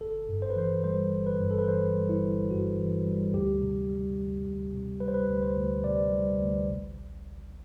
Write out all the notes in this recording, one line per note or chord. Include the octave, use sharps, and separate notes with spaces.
G1 A4
G2
C5
B4
E3 C5
G3 C5
G1
B4
G2
A4
B4
E3 C5
G3
E4
G1
G2 F#4
E3
G3
D2 G4
C3
G3
D2
D2
C3
G3 B4
C5
B4
D2
C5
D2
C3 D5
G3
D2
A1